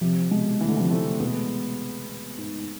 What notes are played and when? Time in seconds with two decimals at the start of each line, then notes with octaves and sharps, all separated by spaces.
0.01 C3 F3
0.31 B2 G#3
0.61 E3 A3
0.68 D3
0.76 C3 E3
0.80 F3
0.91 A3 C4
1.20 B2 G#3 B3
2.38 G#2